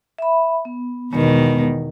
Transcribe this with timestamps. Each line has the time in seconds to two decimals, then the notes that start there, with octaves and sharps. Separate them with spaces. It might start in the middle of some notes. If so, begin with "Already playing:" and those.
0.18 E5 B5
0.65 B3
1.13 E2 B2 D#3 G#3 B3